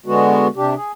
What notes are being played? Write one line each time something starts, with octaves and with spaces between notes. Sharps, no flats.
D3 G#3 B3 F#4
C3 D4 G4
G#4